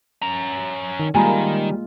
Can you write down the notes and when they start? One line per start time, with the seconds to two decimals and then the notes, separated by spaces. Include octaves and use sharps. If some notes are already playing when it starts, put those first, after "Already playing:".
0.22 C#4 A#5
0.99 D#3
1.14 D#3 G3 G#3 A#3 F4 G#5 A#5 B5